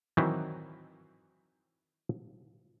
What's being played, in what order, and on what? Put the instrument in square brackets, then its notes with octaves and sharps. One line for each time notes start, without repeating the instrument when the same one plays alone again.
[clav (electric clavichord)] D#3 E3 F#3 C4 D#4 E4